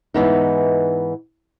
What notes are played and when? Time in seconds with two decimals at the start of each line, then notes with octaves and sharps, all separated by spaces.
0.14 G#2 E3 B3 D#4